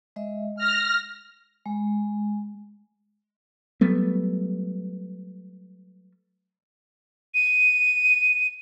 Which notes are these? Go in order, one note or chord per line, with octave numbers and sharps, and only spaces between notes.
G#3 D#5 E5
G#3 F6 A#6
G#3
F#3 G3 A3 B3
D#7